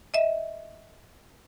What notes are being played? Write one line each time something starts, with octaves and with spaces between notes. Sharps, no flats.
D#5 E5